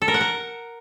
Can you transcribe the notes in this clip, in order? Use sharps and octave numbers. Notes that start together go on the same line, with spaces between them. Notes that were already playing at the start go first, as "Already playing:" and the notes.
A4
A#4
F#5
A#4